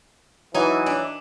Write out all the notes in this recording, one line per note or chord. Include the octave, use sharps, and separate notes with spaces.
E3 F#3 D#4 G#5
D4